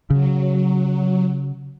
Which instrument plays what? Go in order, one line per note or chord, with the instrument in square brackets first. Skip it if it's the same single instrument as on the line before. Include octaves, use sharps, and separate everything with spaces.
[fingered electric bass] C#3 [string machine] F#3